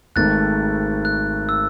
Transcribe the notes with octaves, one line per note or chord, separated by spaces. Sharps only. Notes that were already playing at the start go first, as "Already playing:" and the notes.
G#1 G#2 D#3 A3 F#6 A6
F#6
E6